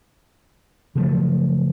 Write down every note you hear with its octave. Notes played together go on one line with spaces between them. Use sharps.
C#3 F3 F#3 A3